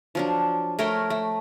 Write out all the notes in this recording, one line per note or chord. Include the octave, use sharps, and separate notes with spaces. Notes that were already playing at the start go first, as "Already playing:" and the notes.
F3 F#3 D4
A3 A#4 C#5 G5
A3